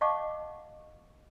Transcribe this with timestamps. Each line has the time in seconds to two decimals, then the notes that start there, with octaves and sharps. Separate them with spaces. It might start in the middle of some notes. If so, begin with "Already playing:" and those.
0.01 D#5 F5 F#5 A5 C#6 D6